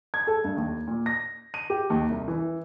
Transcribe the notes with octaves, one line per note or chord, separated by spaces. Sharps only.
G#6
A4
G2
D#2
A#2
A#6
D#7
G4
D#2
C2
E3